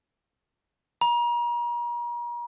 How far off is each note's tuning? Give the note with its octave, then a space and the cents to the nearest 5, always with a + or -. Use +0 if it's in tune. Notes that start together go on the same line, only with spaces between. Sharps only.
A#5 +40